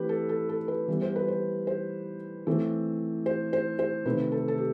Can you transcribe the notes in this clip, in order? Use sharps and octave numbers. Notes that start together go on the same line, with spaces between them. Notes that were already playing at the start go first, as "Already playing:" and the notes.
Already playing: E3 A3 C4 G4 B4
A4
A4
A4
B4
E3 G3 B3
C5
B4
C5
C5
E3 A3 C4
C5
C5
C5
C3 D#3 A3 C4 B4
A4
A4
G4